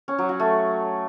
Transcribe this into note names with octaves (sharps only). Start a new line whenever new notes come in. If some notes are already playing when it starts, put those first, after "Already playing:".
C#4
F#3
F#4
A3